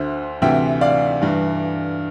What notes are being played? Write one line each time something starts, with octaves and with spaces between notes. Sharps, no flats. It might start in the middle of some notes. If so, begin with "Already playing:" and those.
Already playing: D2 D3 C5 E5
D2 C3 E3 E5 G5
D5 F5
G2 E3